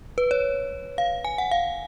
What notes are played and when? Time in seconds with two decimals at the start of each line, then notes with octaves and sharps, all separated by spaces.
0.18 B4
0.31 C#5
0.98 F5
1.25 G#5
1.38 F#5
1.51 F5